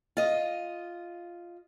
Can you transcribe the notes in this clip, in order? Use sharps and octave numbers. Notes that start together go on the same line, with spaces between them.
F4 D#5